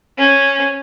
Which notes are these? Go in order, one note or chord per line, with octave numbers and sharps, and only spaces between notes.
C#4